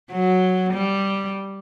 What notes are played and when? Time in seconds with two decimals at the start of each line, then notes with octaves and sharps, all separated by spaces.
0.12 F#3
0.73 G3